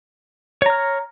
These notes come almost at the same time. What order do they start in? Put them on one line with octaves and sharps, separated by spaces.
C#5 A#5 F6